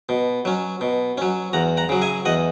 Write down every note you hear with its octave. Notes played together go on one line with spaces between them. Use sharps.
B2
F#3 C#4
B2
F#3 C#4
E2 F#5 A#5
F#5 A#5
C#3 F#3
E5 G#5
E2 D#5 F#5